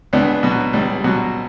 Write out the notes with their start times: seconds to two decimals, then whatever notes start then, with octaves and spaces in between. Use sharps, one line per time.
0.13 C#2 B3 D4
0.43 B2 F#3
0.73 C#2 G3
1.04 B2 F#3